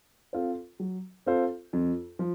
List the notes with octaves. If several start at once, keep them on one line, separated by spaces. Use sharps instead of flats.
C4 F4 A4 C5
F#3
C4 F4 A4 C5
F2
F3